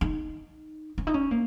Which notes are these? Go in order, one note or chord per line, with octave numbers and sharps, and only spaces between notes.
D#4
C#4
D#4
C#4
A#3